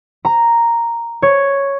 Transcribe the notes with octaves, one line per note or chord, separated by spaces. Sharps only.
A#5
C#5